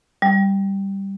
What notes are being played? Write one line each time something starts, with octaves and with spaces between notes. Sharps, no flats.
G3